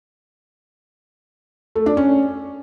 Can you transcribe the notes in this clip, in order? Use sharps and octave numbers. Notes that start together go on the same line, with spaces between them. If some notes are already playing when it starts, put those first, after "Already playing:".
A3
D4
C#4